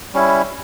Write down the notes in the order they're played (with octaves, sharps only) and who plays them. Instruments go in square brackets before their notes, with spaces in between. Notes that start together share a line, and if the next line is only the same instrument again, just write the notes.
[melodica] G3 C#4 E4